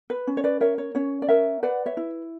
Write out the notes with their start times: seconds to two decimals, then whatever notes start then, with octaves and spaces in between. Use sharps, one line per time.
0.10 B4
0.27 C#4
0.37 C#5
0.44 B4 D5
0.61 A#4 C#5 E5
0.78 C#5
0.95 C#4 C#5
1.22 D5
1.29 A#4 C#5 E5
1.63 B4 D5 F#5
1.86 C#5 E5
1.97 E4